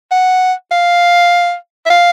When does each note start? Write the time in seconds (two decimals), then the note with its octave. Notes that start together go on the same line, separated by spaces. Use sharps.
0.11 F#5
0.71 F5
1.86 E5
1.90 F5